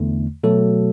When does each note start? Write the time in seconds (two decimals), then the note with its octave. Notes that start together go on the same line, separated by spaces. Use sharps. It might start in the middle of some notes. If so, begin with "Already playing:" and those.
Already playing: E2 D3 A3
0.43 B2 F#3 A3 A4